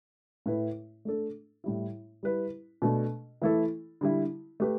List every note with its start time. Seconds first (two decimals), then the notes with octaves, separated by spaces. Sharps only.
0.46 A2 A3 E4 B4
1.05 A3 D4 A4
1.64 A2 G3 E4
2.23 G3 E4 B4
2.82 B2 A3 D4 A4
3.42 E3 A3 E4 A4
4.01 D3 G3 E4
4.60 A3 G4 B4